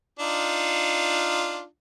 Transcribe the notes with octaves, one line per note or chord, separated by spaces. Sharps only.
D4 D#4 F4